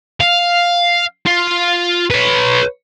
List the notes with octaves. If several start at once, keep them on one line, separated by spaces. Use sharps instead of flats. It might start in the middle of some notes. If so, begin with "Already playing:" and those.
F5
F4
B4 C#5